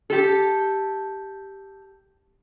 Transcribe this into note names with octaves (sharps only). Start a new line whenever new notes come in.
G4 A4